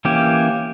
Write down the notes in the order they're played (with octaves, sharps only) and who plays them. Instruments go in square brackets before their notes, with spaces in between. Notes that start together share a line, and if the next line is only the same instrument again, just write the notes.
[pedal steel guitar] E3 A#3 C#4 G4